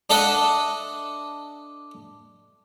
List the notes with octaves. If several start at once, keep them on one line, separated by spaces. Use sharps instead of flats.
D4 A4 D#5 E5 F#5